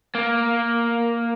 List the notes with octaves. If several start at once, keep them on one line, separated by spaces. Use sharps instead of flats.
A#3